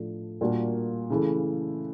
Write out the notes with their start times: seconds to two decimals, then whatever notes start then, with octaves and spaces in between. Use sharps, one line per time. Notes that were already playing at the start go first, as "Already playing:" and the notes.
Already playing: A2 F3 A3 D4
0.41 A#2 G3 A#3 D4 F#4
1.10 C#3 E3 A3